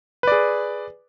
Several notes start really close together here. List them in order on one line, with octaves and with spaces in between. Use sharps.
B4 D5 G#4